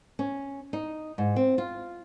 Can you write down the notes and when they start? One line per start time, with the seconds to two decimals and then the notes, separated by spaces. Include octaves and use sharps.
0.19 C#4
0.73 D#4
1.18 G#2
1.36 C4
1.58 F4